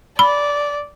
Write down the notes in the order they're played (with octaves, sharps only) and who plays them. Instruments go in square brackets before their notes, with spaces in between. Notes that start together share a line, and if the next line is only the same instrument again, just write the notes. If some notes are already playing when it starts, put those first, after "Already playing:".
[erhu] D5 [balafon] B5